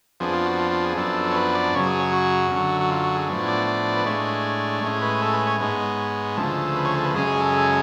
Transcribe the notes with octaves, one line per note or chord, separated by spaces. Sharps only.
F2 F3 B3 D4 G#4
F4
F#4
F4
F4
G#4
F#2 F3 B3 D4 A4
C#5
B4
D5
F#2 C#3 F#3 C#5
G#4
C#5
F#4
F#2 D3 F#3
F#4
F4
F#4
G#4
A2 F3 B3 D4 C#5
D5
D5
B4
A2 G#3 D4 C#5
A2 G#3 C#4
B4
A4
B4
C#5
G#2 G#3 B3 C#5
C#5
D2 C#3 F3 A4
B4
C#5
A4
B4
F#2 C#3 G#3 C#4 G#4
G#4
A4
A4